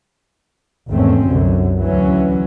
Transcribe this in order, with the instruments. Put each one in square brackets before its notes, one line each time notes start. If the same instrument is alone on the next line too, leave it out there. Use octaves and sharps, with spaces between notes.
[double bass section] G#1 E2 A3 C4 C#4
C2 F#2 D3
D2 E3 F#3 C#4